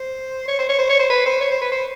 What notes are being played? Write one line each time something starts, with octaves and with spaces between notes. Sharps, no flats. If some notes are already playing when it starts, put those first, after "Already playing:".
Already playing: C5
C#5
C5
C#5
C5
C#5
C5
B4
C5
C#5
C5
B4
C5